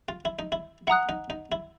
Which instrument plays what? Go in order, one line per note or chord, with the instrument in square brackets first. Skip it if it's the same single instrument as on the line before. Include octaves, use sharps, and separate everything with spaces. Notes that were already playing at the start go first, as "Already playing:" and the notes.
[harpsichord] F4
E4
D#4
E4
[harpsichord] E4 [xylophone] F#5 A#5 D#6 F#6
[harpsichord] D#4
D#4
E4